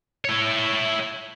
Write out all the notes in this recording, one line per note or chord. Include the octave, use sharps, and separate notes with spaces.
E4 C#5